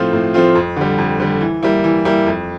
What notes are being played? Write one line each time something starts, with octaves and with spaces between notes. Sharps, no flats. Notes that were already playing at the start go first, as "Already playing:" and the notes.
Already playing: A2 F3 A3 C4 F4
A2
F3 A3 C4 F4
F2
D3 G3
F2
D3 G3
E3
G3 A#3 E4
E3
G3 A#3 E4
F2